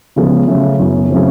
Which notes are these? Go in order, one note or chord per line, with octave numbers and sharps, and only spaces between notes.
C#3 F3 G#3 B3
C#3 F#3 A3
F#2 C#3 F#3 B3 E4
C#3 F#3 A3 C4